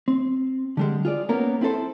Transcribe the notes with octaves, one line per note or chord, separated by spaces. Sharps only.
C4
D3 G3 G#3
F4 G#4 D5
A#3 B3 C#4 A#4
C4 E4 F4 A4 C5